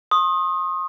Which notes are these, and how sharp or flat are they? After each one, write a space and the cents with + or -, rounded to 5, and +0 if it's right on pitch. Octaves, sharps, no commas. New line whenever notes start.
C6 +40 D#6 +0